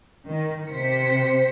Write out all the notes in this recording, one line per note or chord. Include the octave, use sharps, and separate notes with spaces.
D#3
C3 C5 B6 C#7